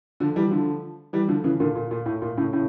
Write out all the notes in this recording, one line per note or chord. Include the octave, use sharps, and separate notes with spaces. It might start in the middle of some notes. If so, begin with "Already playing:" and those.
D3 F3
E3 G3
D3 F3
E3 G3
D3 F3
C#3 E3
A#2 D3
A#2
A#2
A2
A#2
A2 C#3
A2 C#3